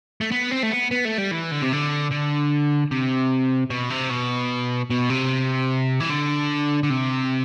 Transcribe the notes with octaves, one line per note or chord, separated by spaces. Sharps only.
A3
B3
C4
A3
B3
B3
A3
G3
E3
D3
C3
D3
D3
C3
B2
C3
B2
B2
C3
E3
D3
D3
C3